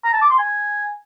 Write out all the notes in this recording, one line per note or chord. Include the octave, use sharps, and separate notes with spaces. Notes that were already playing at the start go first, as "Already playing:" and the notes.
A#5
A5
D6
C6
G#5